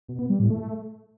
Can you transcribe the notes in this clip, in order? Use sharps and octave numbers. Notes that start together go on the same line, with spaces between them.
B2
B3
G3
A2
A3